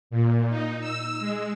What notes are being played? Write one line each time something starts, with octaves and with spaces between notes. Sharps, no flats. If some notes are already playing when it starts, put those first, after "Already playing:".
A#2
D#4
E6
G#3